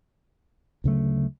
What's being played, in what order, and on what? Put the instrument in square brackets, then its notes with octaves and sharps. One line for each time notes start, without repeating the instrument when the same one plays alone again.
[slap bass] D2 C#3 F#3 A3